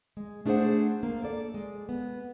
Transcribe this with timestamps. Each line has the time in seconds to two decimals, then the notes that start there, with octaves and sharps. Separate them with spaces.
0.17 G#3
0.46 A3 D4 G#4 A4 C5 F#5
1.03 A#3
1.23 A4 D5
1.54 G#3
1.89 B3